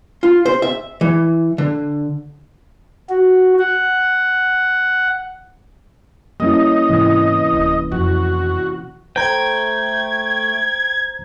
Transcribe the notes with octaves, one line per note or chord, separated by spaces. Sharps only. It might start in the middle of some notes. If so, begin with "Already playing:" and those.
F4
C5
E5
E3
D3
F#4
F#5
G3 A#3 C#4 E4 D#5
G#2 C3 E3
D1
F2 F#4
A3 C5 G5 A#5 G#6